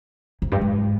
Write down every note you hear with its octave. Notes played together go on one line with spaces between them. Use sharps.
F2
G2
G#2